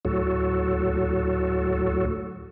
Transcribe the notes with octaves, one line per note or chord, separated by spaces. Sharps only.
D2 A2 F#3 F#4 A4